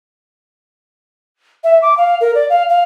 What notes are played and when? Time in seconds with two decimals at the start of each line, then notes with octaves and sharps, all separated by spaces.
1.64 E5
1.82 D6
1.97 F5
2.21 A#4
2.35 D5
2.50 F5
2.69 F5